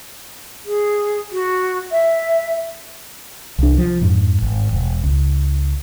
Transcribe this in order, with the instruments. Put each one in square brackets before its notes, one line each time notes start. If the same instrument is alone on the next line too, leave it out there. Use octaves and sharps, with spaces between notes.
[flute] G#4
F#4
E5
[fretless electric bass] C2 D4
F3
F2 G#2
G#1
E1
C#2